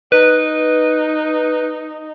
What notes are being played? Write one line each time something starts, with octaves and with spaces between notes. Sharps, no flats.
D#4 B4